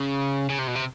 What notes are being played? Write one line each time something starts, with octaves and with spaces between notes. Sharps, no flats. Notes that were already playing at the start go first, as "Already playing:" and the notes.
Already playing: C#3
C#3
C3
B2
C3